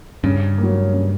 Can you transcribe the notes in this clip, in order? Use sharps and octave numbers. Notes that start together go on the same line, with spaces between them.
G2 C#3
A#3
F#3
C#3